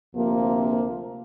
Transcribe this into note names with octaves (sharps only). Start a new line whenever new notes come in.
D2 C3 F3 A#3